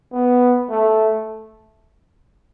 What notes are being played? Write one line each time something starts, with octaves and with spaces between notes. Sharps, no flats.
B3
A3